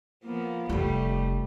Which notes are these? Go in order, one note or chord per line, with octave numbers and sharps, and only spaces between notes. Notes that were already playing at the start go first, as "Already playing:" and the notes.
F3 A#3 B3
F1 G3 A3 F4